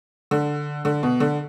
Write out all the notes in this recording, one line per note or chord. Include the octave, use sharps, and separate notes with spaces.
D3
D3
B2
D3